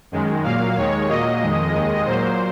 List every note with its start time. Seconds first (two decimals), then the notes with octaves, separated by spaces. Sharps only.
0.12 F#2 D#3 G#3
0.44 A#2 F#3 A#3 F5
0.77 D#2 D#3 G#3 C#5
1.08 A#2 F#3 A#3 D#5
1.41 F2 D#3 G#3
1.72 D#2 D#3 G#3
2.05 A#2 F#3 A#3 C5